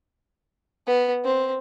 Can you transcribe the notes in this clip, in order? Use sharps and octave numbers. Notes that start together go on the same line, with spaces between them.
B3
C4